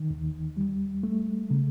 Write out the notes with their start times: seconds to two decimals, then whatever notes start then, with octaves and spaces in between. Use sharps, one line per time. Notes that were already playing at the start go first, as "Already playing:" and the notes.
Already playing: D#3
0.11 D#2
0.57 G3
1.03 A3
1.50 C#3